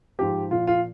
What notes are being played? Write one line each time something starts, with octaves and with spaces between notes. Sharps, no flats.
G#2 F3 G4
A#2 F3 F4
F4